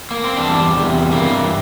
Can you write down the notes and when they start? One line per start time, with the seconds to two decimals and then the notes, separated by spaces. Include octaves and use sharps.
0.11 A#3
0.24 C4
0.36 E2 E3 G3 D4
0.74 E2 C3 G3
1.11 G2 E3 G3 A#3